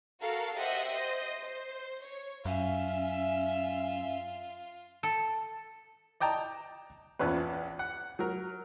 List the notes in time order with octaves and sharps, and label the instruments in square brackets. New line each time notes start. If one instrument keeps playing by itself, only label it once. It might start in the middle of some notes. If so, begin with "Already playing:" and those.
[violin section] F#4 A4 A#4 F5
G4 C5 D#5 E5 F#5
C5 D#5
C5
C#5
[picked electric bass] F#2 [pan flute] C#4 [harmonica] F4 [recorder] E5
[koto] A4
[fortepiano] D5 D#5 G5 A5 A#5
A#1 E2 F3 C#4 B4
F#5
F#3 A#4